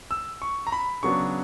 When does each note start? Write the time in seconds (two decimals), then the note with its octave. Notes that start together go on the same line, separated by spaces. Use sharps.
0.11 E6
0.42 C#6
0.67 A#5
0.72 B5
1.03 C#3 F#3 B3 D4 C#6